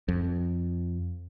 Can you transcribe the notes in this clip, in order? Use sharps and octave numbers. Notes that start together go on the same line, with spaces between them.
F2